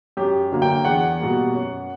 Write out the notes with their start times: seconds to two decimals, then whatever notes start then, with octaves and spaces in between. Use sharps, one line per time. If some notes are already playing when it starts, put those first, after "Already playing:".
0.17 F#2 G4
0.52 D3 F#3 A#3
0.62 G5
0.85 E2 F#5
1.19 B2 G3 A#3
1.54 F#2